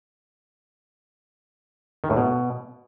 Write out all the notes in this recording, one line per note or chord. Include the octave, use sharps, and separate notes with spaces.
D#3
A2
B2